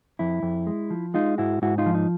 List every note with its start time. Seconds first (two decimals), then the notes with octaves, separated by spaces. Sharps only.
0.19 F2 E4
0.43 F2
0.67 G#3
0.90 F3
1.14 G#3 D#4 F4
1.38 G#2 E4 F#4
1.62 G#2 E4 F#4
1.78 D#4 F4
1.86 F3
1.95 D#4